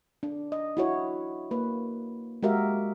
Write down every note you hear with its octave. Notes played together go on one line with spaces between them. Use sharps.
D4
D#5
E4 F#4 C#5
A#3 B4
G#3 F#4 G4 A#4 E5 F5